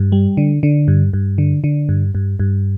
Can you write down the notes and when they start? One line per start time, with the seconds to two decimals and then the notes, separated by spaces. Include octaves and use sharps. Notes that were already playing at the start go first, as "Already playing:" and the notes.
Already playing: G2
0.12 G3
0.37 D3
0.63 D3
0.88 G2
1.13 G2
1.38 D3
1.64 D3
1.89 G2
2.15 G2
2.39 G2